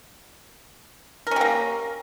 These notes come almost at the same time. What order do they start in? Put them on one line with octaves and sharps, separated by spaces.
A#4 C#4 G4 A#3